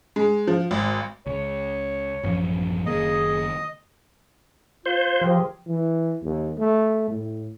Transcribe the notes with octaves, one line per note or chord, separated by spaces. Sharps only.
G#3
F3
G#1
C#2 C#5
A1 F#2 F3
F#1 D#3 A#3 G#4 D#5
F4 C5
F3 G4 G#4 A#4
E3
D#2
A3
A2